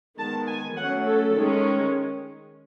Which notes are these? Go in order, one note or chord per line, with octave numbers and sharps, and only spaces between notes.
D#3 G#3 B3 A5
G#5
F#3 A3 C#4 F#5
A4
D#3 G#3 C#4